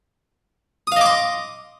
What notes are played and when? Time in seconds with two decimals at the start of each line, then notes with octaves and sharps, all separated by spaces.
0.87 D#6
0.92 F5
0.96 D#5
1.01 D6
1.06 C6